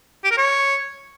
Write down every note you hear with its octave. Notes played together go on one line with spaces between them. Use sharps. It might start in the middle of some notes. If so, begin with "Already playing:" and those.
G4
A#4
C#5